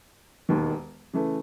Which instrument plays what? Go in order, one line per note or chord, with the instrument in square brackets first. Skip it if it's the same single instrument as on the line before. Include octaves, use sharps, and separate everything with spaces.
[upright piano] E1 D#2 D#3
C#3 E3 A3